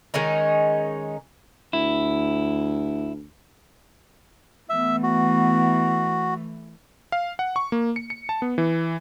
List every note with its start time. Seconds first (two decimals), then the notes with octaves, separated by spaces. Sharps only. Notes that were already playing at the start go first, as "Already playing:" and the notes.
0.14 D#3 G#3 C#4 D#4
1.73 D2 E4
4.69 E3 A3 B3 E5
5.03 F#4
7.12 F5
7.39 F#5
7.56 C#6
7.72 A#3
7.96 C#7
8.10 C#7
8.29 A5
8.42 B3
8.58 E3